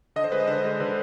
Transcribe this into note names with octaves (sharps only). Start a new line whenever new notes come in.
D3 D#5
C5
G#3 B4
D#5
D3 C5
G#3
D3 B4